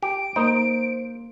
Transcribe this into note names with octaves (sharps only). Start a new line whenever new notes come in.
G4 D7
A#3 D#4 C5